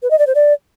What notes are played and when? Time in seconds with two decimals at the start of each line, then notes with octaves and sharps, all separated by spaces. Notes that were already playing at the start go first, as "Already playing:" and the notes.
0.03 B4
0.11 D#5
0.19 D5
0.27 C5
0.35 D5